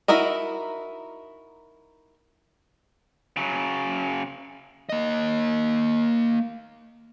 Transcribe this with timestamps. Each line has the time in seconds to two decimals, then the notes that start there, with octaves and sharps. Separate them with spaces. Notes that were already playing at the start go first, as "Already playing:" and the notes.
0.08 D#4 E4 F#4 A#4 D#5
3.37 C#3 F#3
4.89 A#3 D#5